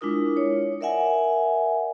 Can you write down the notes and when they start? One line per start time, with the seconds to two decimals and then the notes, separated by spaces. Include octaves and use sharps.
0.01 G#3 D4 E4 F4 A#4 D#6
0.37 C#5
0.81 A#4 D5 E5 F#5 G#5